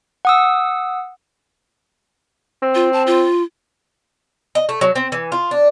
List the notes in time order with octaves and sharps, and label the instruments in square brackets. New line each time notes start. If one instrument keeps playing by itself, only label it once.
[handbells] F#5 D#6 E6
[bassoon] C4
[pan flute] F4
A5
F4
[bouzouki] D#5
A3
F#3
C4
E3
F4
D4